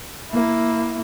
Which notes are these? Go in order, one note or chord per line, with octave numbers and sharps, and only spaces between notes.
A#3 E4